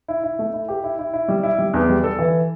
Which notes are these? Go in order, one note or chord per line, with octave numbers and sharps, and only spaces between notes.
E4
E4
A3
E4
G4
E4
E4
E4
G3
E4
G3
E2
G3
A4
E3